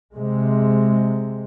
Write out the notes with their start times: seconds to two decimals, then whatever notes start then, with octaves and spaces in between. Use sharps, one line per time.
0.14 C3 G#3